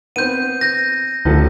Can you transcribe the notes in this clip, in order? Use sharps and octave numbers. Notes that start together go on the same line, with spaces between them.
B3 C4 G6 D#7
G6 A#6
A1 D2 F3 A4